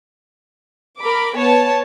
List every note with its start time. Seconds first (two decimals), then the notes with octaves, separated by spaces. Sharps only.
0.99 A#4 B5 D6
1.36 B3 C#5 A5